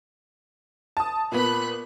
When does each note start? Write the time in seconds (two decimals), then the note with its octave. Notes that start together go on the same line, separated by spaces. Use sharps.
0.97 A5 D#6
1.32 A#2 B3 B5 F#6